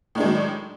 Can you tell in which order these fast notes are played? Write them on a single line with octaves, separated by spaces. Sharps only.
A2 D4 G#3 D#3 F#3